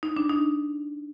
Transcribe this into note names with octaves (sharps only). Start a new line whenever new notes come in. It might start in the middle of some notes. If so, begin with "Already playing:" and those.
D#4
D4
D#4